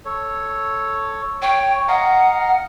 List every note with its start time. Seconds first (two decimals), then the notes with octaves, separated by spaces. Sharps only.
0.05 A4 C#5
1.42 C#5 G5
1.88 D#5 F5 F#5 A#5